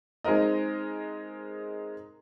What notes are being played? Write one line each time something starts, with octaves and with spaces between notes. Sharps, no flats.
G#3 C4 D#4 A#4 D#5